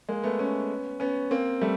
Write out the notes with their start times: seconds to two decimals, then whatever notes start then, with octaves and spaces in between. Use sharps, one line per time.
0.09 G#3 A#3
0.23 A3 B3
0.39 B3 C#4
1.00 B3 C#4
1.31 A#3 C4
1.61 G3 A3